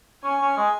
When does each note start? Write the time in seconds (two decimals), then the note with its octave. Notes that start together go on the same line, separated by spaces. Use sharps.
0.24 C#4 G#5
0.41 C#4
0.57 G#3